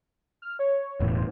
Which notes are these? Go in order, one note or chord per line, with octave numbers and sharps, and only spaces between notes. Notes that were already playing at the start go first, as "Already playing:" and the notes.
F6
C#5
E1 A2 E3
C5